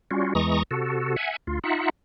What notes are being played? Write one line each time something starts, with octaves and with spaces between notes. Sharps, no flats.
G3 C#4 F4 F#4
E2 E3 G#3 A#5 C#6 D#6
C3 F#4 A4
E5 F#5 G#5
D2 F4
D#4 F4 E5 F#5